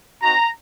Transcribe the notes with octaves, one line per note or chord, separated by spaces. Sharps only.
C4 D#4 F#4 A#5